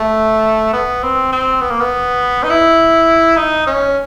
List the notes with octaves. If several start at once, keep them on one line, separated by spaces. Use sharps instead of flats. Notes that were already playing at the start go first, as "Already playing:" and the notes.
Already playing: A3
B3
C4
C4
B3
A#3
B3
D#4
E4
D#4
C#4